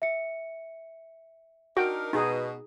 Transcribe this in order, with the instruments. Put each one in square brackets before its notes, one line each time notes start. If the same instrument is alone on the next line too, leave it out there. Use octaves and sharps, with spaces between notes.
[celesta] E5 C#7
[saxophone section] D4 D#4 A#4 [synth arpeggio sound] F#4 [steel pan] G5
[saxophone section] B2 [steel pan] D#4 G#4